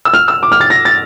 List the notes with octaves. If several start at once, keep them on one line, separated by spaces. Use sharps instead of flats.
E6
F6
E6
D6
F6
A6
A#6
A6